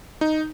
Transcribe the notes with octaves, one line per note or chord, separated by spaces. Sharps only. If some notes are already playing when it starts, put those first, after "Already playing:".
D#4